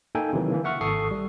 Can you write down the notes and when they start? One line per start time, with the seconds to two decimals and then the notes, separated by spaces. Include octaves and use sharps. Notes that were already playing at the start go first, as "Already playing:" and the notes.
0.15 A#3 D#4 A4 G5 G#5
0.33 C3 D#3 E3 F#3
0.51 D3 E3 A#3
0.64 E5 F#5 C#6 F6
0.81 G#1 A4 C#6 D#6 C7
1.11 G3